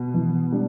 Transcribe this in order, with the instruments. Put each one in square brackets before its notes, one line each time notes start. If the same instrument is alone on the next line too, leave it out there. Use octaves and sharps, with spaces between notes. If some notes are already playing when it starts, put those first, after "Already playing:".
Already playing: [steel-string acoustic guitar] B2
[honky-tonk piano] E3
G3 D4